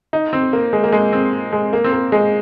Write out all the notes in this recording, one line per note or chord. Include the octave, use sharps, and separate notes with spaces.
D#4
C4
A#3
G#3
A#3
G#3
C4
G#3
A#3
C4
A#3
G#3